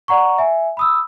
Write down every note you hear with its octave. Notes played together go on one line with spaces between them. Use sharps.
D5 F#5 A#5 C#6
E5 G#5
B5 D#6 E6